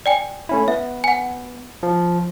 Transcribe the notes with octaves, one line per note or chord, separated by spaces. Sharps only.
D5 G5 G#5
A3 C#4 E4
B3 E5
F#5 G#5
F3